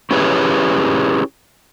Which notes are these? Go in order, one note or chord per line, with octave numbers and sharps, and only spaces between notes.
C#4 E4 G4 G#4 B4 C#5